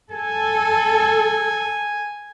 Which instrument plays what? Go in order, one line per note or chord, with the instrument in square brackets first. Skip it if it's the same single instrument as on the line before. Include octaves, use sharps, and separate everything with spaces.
[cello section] A4 [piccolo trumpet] G#5